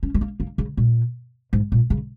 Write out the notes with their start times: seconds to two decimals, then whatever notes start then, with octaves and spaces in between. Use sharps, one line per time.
0.03 C#4
0.14 G#3
0.21 A#3
0.40 A#3
0.58 C#3
0.77 A#2
1.53 G#2
1.72 A#2
1.90 C#3